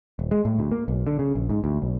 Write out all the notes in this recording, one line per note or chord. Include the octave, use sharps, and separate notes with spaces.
D#1
G#3
A2
D2
A#3
B1
D3
C#3
A#1
G#2
D2
B1